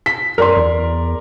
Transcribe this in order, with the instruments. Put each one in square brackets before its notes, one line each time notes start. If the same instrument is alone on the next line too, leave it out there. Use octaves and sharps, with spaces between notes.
[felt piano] B6
[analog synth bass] F#2 [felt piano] A#4 D5 C6
[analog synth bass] E2